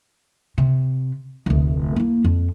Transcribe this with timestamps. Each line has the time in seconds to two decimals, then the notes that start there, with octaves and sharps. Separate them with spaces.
0.58 C3
1.46 F1 D2
1.96 A#3 E4
2.24 F2